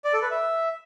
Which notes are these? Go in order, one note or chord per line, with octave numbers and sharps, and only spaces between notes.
D5
A4
B4
E5